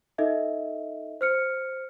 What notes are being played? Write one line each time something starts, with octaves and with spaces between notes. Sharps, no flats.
D#4 A4 D#5 E5
C5 F6 C#7